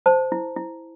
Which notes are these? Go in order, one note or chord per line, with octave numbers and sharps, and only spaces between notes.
C5 A5
E4
E4